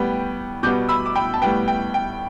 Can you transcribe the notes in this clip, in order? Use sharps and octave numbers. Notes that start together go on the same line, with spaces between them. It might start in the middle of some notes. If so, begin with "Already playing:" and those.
Already playing: A2 G3 B3 G5
B2 G3 B3 D6 G6
B5 E6
D6
G5 B5
A5
A2 G3 B3 G5
G5
G5